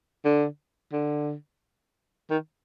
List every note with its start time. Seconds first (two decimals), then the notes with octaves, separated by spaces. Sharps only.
0.25 D3
0.93 D3
2.30 D#3